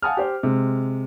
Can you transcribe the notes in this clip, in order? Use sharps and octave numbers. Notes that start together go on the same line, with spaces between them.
F5 F#5 G#5 A5 D#6 F6
G4 C5
C3 G#3